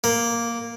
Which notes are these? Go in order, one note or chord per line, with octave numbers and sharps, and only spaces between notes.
A#3